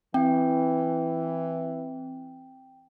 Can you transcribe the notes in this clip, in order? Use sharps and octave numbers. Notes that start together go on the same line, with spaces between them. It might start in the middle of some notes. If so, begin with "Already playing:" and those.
E3 C4 G5